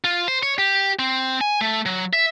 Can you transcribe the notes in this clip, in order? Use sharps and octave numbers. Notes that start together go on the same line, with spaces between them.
F4
C5
C#5
G4
C4
G#5
A3
F#3
E5